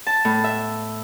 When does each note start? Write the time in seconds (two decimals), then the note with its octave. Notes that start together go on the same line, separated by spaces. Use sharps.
0.07 A5
0.25 A2
0.44 E5